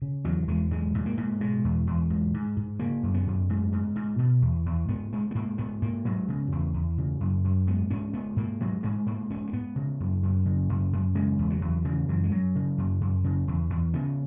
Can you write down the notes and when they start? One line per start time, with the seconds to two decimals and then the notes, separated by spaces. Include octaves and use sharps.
0.02 C#3
0.24 E2 F#3
0.48 E2 G#3
0.71 G#2 G#3
0.94 G#2
1.06 A#3
1.17 G#2
1.41 B2 G#3
1.64 E2
1.87 E2
2.10 G#2
2.34 G#2
2.56 G#2
2.80 C#3 A#3
3.03 F#2
3.14 B3
3.27 F#2
3.49 G#2
3.73 G#2
3.95 G#2
4.19 B2
4.42 E2
4.66 E2
4.88 G#2 B3
5.12 G#2 G#3
5.31 B3
5.35 G#2 A#3
5.58 G#2 B3
5.82 G#2 A#3
6.05 G#2 F#3
6.28 C#3
6.52 E2
6.74 E2
6.98 C#3
7.20 F#2
7.44 F#2
7.67 G#2 B3
7.90 G#2 C#4
8.13 G#2 B3
8.36 G#2 A#3
8.60 G#2 F#3
8.83 G#2 G#3
9.06 G#2 A#3
9.30 G#2 C#4
9.47 A#3
9.53 G#2 B3
9.76 C#3
10.00 F#2
10.23 F#2
10.46 C#3
10.69 F#2
10.93 F#2
11.15 C#3 G#3
11.39 E2
11.50 F#3
11.61 E2
11.84 C#3 E3
12.08 F#2 E3
12.24 G#3
12.31 F#2 F#3
12.55 C#3
12.78 F#2
13.01 F#2
13.24 C#3
13.48 E2
13.70 E2
13.94 C#3 B3